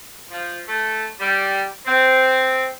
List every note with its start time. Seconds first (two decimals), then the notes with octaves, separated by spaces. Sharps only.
0.29 F3
0.68 A3
1.20 G3
1.86 C4